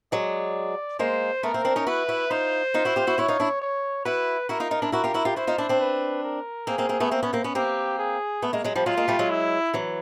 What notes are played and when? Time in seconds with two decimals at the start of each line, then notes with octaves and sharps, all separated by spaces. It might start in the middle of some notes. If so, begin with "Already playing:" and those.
0.12 F#3 G#3 D5
0.99 G#3 A#3 C5
1.43 A3 B3 A#4
1.54 A#3 C4
1.65 C4 D4
1.76 C#4 D#4
1.87 E4 F#4 B4
2.09 E4 F#4
2.31 D#4 F4 C5
2.74 D#4 F4
2.85 E4 F#4
2.96 F4 G4
3.07 E4 F#4
3.18 E4 F#4 C#5
3.28 D#4 F4
3.40 D4 E4
3.61 C#5
4.05 E4 F#4 B4
4.49 E4 F#4 A#4
4.60 D#4 F4
4.71 D#4 F4
4.82 D4 E4
4.92 E4 F#4 A#4
5.04 F4 G4
5.14 E4 F#4
5.25 F4 G4
5.36 E4 F#4 C5
5.47 D#4 F4
5.58 D4 E4
5.69 C4 D4
5.80 B4
6.24 A#4
6.67 A#3 C4 G#4
6.78 A#3 C4
6.89 A#3 C4
7.00 A3 B3
7.11 A#3 C4
7.23 B3 C#4
7.33 A#3 C4
7.44 B3 C#4
7.55 A#3 C4 G4
7.99 G#4
8.42 A3 B3
8.53 G#3 A#3
8.64 F#3 G#3
8.75 F3 G3
8.86 F#3 G#3 F4
8.97 G#3 A#3
9.08 G3 A3
9.19 F#3 G#3
9.30 E4
9.74 E3 F#3